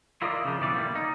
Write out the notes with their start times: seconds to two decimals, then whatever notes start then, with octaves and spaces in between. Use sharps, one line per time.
0.22 E4 F4 A#4 D5 D#5
0.45 C#3 F3 D4
0.60 B1 E3 G3 D5
0.73 D3 G3 A3 A#3
0.95 D#4